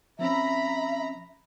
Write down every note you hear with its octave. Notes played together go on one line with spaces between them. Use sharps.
F3 C4 C#4 E5 A#5 B5